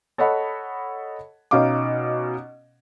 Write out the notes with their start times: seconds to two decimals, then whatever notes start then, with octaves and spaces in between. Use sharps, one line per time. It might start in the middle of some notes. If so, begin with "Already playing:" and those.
0.18 A4 C#5 D#5 F#5 A5 B5
1.51 B2 C#4 D#4 F5 D6